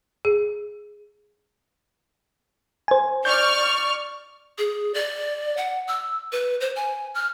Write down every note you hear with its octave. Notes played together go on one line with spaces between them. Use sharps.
G#4
C5 G#5
D5 C#6 F6 G6
G#4
D5
F#5
E6
B4
C5
G#5
F6